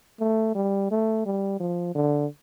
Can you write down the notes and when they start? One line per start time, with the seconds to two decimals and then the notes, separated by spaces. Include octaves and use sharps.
0.20 A3
0.55 G3
0.91 A3
1.26 G3
1.60 F3
1.95 D3